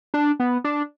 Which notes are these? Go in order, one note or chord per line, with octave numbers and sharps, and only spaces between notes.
D4
B3
D4